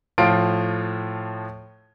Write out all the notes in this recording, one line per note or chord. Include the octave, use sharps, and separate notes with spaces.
A2 F3 F4 D7